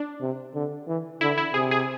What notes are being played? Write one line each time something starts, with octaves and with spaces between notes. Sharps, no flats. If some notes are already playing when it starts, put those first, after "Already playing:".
Already playing: D4
C3
D3
E3
D3 E4
E4
C3 G#4
G#4